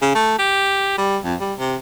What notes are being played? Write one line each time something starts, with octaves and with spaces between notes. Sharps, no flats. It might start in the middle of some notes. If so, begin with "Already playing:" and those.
C#3
A3
G4
G3
F2
G3
C3